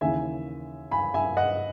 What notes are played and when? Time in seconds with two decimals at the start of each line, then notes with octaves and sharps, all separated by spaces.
0.01 D#2 C#3 E3 E5 G#5
0.91 G#5 B5
1.14 E5 G#5
1.37 D#5 F#5